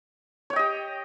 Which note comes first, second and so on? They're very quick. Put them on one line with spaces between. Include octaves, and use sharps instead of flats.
C#5 G5 D#5 G4